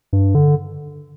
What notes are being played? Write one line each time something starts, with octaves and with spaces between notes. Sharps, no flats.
G2
D3